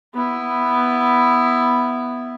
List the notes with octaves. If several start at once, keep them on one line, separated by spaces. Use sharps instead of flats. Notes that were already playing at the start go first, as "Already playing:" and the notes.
B3 E4